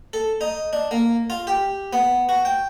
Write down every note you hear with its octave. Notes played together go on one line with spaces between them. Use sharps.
A4
D#4
D4
A#3
F4
G4
B3
F#4
G5